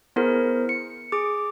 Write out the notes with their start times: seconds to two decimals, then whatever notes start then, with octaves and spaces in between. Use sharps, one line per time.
0.16 B3 E4 G#4 A#4 C5
0.69 C#7
1.12 G#4 D6